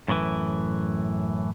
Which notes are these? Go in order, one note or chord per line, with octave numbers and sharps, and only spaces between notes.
F#2 A2 D#3 E3